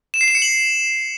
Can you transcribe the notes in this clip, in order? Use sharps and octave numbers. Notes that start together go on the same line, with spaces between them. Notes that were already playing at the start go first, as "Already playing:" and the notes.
E7
C7
E7
C#7
F#7